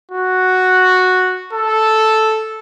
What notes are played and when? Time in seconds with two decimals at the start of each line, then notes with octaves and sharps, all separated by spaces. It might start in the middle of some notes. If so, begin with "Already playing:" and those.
0.11 F#4
1.53 A4